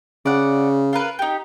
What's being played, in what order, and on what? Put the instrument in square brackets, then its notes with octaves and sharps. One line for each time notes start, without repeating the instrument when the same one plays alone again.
[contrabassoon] C#3 [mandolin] D5 F#5
[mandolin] F4 A#4 B4
D#4 G4